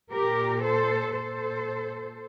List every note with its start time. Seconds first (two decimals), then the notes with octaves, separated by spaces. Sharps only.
0.12 A#2 G4 A#4
0.63 A4 C5
1.13 A#2 A4 C5